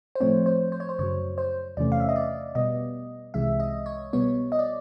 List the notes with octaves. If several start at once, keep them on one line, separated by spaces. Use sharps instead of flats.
C5
A2 F3 A3 C4 C#5
C5
C5
C#5
C5
F#2 C#3 F#3 C#5
C5
E2 C3 E3 A3 C#4 D5
F5
E5
D#5
D5
B2 G3 B3 D#5
C2 C3 E3 G#3 E5
D#5
C#5
B2 G3 B3 C#5
D#5
D5